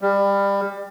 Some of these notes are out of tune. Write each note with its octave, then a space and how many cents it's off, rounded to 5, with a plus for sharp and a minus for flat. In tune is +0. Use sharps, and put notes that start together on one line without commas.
G3 +25